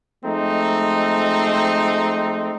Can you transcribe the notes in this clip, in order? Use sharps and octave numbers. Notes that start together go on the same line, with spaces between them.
F3 G#3 A3 C4 D#4